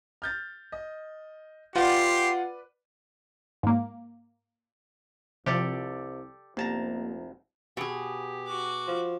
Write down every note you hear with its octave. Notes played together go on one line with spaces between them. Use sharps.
F6 G6 A6
D#5
F4 G4 B4 D5 F#5 C6
G#2 A#3
C2 C3 F3 G3 G4 A4 D5
F1 C2 A#3 B3 G4 A5 A#5
B2 G4 G#4
F#4 D6
F3